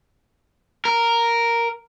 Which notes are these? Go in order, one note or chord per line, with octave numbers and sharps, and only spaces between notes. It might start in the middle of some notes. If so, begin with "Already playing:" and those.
A#4